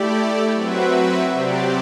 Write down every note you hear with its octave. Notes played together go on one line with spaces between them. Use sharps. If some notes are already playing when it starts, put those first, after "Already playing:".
Already playing: A3 E4 G4 D5
F#3 C4 F#4 B4 E5
C3 F#3 C4 G4 D5